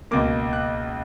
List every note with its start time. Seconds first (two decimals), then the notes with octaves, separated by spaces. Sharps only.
0.11 C#2 B2 A#3 D6
0.53 F#6